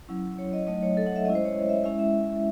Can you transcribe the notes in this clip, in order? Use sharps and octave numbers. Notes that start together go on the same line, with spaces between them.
F#3 C#4 E4
C#5
D#5
F#3 A3 D#4 D#5
C#5
A4
F#5
E5
G#3 C#4 E4 D#5
C5
C#5
E5
G#3 C#4 E4 E5
E5